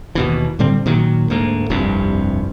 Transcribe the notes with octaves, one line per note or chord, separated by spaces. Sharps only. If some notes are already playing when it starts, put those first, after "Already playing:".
D#2 B2 E3
A2 D3 G3 C4
A#2 D#3 F#3
D2 G#2 A#3
F1 C2 G2 C3